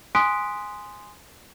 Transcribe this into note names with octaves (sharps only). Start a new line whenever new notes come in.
G#5 C6 D#6 F#6 B6 D7